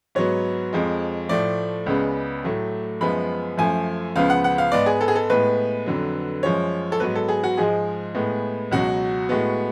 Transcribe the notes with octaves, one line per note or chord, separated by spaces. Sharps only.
G#2 F#3 B3 C#5
F2 F3 G#3
A2 F3 A3 D5
C#2 C#3 G#3 B3
A2 F#3 A3
F#2 F3 G#3 B3 B5
F#2 F3 A3 G#5
C#2 C#3 F3 B3 F5
F#5
F#5
F5
G#2 G#3 B3 D5
G#4
A4
G#4
A4
A2 G#3 B3 B4
F2 D3 F#3
F#2 F3 G#3 C#5
A4
G#2 F#3 B3 B4
A4
G#4
F#4
G#2 F3 G#3 G#4
A2 G#3 B3
C#2 B2 F#3 F#4
A2 G#3 B3